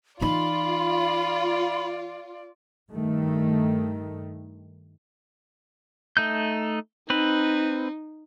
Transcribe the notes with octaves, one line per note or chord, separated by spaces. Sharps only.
E3 D#4 F4 D5 B5
G2 D#3 A3
A3 D#4 G6
C4 D#4 B4